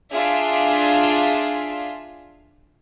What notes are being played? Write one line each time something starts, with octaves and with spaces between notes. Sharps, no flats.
D4 F4 G#4 E5